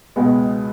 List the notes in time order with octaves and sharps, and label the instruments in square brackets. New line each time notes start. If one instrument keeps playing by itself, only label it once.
[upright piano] C#2 B2 G#3 B3